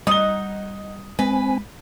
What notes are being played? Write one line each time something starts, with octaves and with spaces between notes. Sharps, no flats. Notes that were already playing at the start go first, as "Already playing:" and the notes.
G3 D#4 F#5 D#6 G7
G#3 C4 B4 G#5